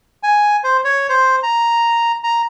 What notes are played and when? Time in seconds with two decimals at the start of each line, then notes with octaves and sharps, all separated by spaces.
0.23 G#5
0.64 C5
0.84 C#5
1.09 C5
1.43 A#5
2.23 A#5